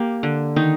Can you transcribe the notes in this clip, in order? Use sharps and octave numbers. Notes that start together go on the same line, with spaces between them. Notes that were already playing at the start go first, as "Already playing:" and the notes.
Already playing: A#3 G4
D3
D#3 D#4